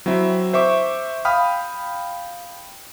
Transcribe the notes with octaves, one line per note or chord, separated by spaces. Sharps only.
F#3 C4 E4 E5
C5 E5 C#6 D6
F5 G5 B5 D#6 F6